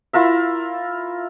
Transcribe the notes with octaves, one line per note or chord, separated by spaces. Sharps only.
E4 F4 A#4 E5